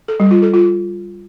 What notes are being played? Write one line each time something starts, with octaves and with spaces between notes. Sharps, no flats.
A4
G3
F4
A4
F4